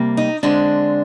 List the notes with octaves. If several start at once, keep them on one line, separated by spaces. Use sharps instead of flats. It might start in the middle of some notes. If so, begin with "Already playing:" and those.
Already playing: C3 G3 A#3
D#4
D3 G#3 C4 D4